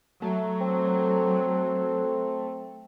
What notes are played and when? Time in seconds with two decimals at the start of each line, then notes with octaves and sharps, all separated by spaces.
0.22 F#3 A3
0.61 C4